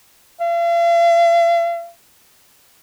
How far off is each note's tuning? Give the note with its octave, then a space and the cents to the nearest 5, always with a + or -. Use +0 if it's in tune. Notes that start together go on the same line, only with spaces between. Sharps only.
F5 -45